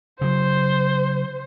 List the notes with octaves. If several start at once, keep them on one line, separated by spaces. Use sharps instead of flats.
C#3 F#3 C5